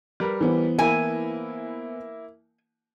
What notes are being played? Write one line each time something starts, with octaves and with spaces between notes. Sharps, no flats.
G3 A#4 B4
E3 B3 C5
A#3 E4 G#5